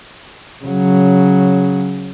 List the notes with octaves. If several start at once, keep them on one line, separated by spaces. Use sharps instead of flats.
C#3 F#3